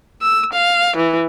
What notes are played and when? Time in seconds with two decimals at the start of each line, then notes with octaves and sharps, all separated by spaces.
0.21 E6
0.53 F5
0.96 E3